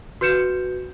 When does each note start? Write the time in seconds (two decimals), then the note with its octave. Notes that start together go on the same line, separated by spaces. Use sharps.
0.21 F#4 B4 G6 C#7 E7